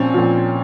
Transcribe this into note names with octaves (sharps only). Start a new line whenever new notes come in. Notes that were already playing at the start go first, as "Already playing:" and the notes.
Already playing: A#2 F3 C4 C#4
A#2 F3